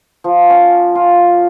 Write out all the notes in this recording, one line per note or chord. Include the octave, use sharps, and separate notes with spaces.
F3
C#4
F4